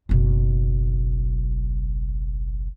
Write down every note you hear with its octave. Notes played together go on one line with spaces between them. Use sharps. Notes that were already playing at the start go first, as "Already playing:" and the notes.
F#1 B1